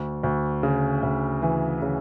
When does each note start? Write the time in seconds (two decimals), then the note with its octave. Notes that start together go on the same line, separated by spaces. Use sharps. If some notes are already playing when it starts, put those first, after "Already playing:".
Already playing: D2
0.23 D2
0.63 C#3
1.03 D2
1.42 E3
1.82 C#3